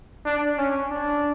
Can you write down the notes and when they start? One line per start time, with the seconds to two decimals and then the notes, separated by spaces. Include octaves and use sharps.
0.26 D4
0.58 C#4
0.91 D4